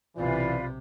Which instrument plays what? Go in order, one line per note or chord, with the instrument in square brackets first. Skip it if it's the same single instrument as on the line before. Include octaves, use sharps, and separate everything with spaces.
[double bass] B1 C3 [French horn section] E3 [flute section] F4 B4 D5